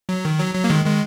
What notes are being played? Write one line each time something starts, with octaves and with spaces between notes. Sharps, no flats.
F#3
D#3
F#3
F#3
A#3
D#3 G#3
D#3 G#3